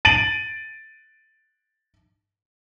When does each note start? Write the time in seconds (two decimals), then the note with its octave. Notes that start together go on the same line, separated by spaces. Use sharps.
0.05 A6 D7 D#7 F#7